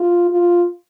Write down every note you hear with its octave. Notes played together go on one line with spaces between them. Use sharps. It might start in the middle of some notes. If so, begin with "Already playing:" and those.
Already playing: F4
F4